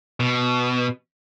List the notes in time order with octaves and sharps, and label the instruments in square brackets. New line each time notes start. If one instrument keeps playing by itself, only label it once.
[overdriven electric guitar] B2